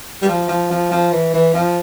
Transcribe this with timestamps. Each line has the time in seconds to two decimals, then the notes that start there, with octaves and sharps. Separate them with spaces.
0.22 G3
0.28 F3
0.48 F3
0.70 F3
0.91 F3
1.12 E3
1.33 E3
1.54 F3